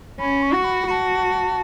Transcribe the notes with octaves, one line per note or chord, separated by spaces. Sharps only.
C#4 B5
C#6
F#4
B5
F#4 A5 B5